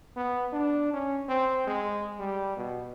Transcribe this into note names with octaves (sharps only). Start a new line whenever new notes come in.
B3
D4
C#4
C4
G#3
G3
B2